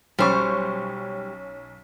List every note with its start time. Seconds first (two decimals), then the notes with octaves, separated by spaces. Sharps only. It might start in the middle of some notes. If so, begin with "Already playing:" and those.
0.19 B1 G3 C#4 C5 C#6